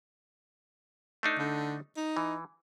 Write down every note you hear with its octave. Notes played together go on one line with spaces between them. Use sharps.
A3 D4 D#4
D3
D#4
E3